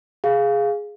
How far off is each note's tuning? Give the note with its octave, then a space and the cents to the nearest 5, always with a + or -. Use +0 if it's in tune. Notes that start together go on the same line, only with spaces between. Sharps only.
G#4 +0 F5 +0